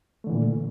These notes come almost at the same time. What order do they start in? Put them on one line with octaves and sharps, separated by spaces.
A3 D3 E3 A#2